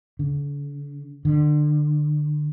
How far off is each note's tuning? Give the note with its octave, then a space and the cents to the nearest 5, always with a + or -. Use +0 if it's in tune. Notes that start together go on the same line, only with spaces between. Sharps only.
D3 -45
D3 +30